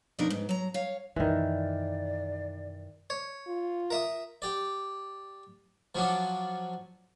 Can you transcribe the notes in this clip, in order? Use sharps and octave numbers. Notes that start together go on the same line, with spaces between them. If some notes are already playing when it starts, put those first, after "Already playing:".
F2 B2 A#3 D4 D#4 A#4
G#2 B3
F#3 A#5
C#5 F5
F#2 B2 D#3 E3 D5
C#5
F4
A#4 E5 D#6
G4 D5
F3 F#3 C#4 D4